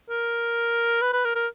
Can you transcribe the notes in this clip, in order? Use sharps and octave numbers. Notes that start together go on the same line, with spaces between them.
A#4
B4
B4
A#4
A#4